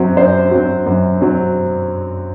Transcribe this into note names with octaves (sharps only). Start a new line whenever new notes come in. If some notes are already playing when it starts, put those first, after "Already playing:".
Already playing: F#2 F#3 C4
F#2 C5
F#3 C4
F#2
F#3 C4